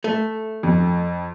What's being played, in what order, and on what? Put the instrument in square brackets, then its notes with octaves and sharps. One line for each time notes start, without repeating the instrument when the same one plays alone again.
[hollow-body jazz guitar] A3
[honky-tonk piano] F2